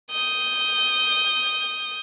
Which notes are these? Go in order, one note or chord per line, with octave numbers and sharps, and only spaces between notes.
D#6 G6